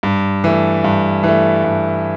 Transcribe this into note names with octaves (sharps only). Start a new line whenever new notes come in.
G2
E3 A3
G2
E3 A3
G2